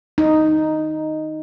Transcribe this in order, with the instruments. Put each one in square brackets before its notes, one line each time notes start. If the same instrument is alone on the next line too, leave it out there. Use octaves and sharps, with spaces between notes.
[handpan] D#4